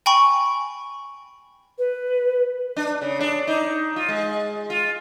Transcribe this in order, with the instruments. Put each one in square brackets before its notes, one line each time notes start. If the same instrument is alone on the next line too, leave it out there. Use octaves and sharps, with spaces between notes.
[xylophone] G5 G#5 B5 C#6
[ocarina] B4
[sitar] D4
C#3
D4
D#4
F4
G#3
F4